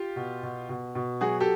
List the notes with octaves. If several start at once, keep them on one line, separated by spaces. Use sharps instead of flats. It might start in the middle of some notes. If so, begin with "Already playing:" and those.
Already playing: F4 G4
B2
B2
B2
B2
F#3 F#4 G#4
G4 A4